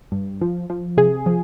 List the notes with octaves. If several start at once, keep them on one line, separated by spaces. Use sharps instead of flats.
G2
F3
F3
C3 G#4
F3